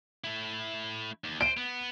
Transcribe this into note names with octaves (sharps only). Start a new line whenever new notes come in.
A3 E4
D#2
C5 D7
B3